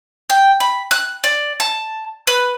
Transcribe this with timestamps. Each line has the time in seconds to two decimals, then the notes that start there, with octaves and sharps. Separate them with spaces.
0.30 G5
0.60 B5
0.91 F#6
1.24 D5
1.60 A5
2.27 B4